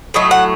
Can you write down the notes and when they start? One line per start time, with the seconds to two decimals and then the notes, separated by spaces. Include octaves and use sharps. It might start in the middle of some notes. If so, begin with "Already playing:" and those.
0.14 A2 F#3 A3 D#5
0.31 F#5